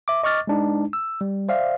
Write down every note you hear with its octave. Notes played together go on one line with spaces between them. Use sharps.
E5 D6
D#5 C#6 D6 F6 A6
G#3 D4 D#4
E6
G3
C5 D5 E5 F5